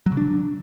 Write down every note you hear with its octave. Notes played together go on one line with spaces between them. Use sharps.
F#3
C#3
D4